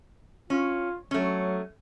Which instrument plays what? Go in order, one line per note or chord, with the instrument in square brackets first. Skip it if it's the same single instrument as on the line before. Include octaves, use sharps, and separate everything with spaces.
[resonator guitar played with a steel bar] C#4 [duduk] F4
[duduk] F#3 [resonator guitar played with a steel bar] A3 C#4